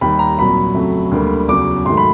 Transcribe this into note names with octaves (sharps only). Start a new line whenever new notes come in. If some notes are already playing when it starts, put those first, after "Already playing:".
D#2 D#3 G3 A#3 B5
A#5
C2 A#2 F#3 B5
F2 C#3 F#3 A3
D2 D3 G3 A#3
E2 C#3 F#3 D6
G#2 D#3 F#3 A3 C6
B5